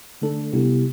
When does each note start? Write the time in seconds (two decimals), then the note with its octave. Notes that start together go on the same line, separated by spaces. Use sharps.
0.22 D3 A3 D4 A4
0.53 C3 G3 B3 E4 G4